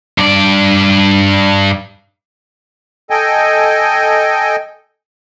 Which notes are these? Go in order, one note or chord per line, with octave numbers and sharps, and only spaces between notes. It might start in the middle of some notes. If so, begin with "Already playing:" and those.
G2 D5
A4 D#5 G5 G#5